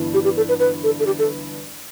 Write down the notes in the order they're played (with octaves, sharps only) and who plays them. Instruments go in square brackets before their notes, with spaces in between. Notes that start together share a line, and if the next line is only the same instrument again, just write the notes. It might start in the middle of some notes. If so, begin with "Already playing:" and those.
Already playing: [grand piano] G1 G2 E3 B3 E4
[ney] G4
G4
A4
B4
B4
A4
A4
G4
A4